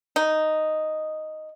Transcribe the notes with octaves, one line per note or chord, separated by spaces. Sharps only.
D#4